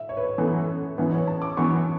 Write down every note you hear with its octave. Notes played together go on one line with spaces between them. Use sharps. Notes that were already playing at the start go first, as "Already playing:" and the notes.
Already playing: E5
C#5
B4
C#5
F#2 E3 B3 A4
F#2 E3 B3 B4
C#5
A5
D6
F#2 E3 B3 C#6